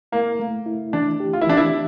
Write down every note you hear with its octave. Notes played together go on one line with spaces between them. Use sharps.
A#3 E4
A3
E4
E3 D4
G4
F4
E4
E3 D4
E4